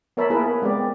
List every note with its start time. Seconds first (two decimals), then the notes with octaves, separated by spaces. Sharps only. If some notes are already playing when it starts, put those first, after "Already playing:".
0.17 B3 A#4 C#5 E5 A5 B5
0.30 A#3 E4 G#4 A#4 B4
0.62 G#3 B3 C4 G4 D5